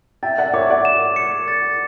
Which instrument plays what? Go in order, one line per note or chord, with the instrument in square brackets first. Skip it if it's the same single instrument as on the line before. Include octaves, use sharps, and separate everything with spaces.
[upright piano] E5 G5 [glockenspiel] A6
[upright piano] D5 F#5
[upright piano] C#5 E5 [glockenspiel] D6
[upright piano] D5 F#5
[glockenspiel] E7
C#7
A6